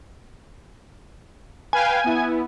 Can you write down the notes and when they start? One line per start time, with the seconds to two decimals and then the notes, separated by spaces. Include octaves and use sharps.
1.73 B4 F5 G5 G#5
2.04 B3 E4